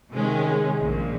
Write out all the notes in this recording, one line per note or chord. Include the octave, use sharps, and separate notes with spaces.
C3 D#3 G#3 C#4
A#1 A#2 F3